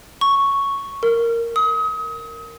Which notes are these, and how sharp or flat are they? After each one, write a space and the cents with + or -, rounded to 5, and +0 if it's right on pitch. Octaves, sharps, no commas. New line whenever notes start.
C#6 +0
A#4 -10
D#6 +35